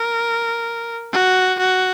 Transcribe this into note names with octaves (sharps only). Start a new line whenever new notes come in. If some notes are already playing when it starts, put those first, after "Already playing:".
Already playing: A#4
F#4
F#4